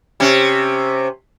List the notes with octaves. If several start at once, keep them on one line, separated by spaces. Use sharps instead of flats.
C3 C#4